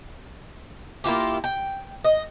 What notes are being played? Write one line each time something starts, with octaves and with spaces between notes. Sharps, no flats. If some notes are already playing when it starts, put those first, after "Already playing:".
A#3 E4 F4 G4
G5
D#5